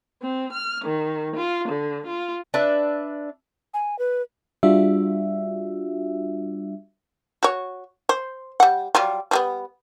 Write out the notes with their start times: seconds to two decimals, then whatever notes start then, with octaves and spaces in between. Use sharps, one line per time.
0.22 C4
0.53 F6
0.85 D#3
1.35 F4
1.68 D3
2.07 F4
2.54 D4 B4 E5
3.74 G#5
3.99 B4
4.63 G3 D4 F4 F#4 E5
7.43 F#4 C#5
8.09 C5
8.60 G3 F#5
8.95 F#3 G3 F4
9.31 F3 G3 B3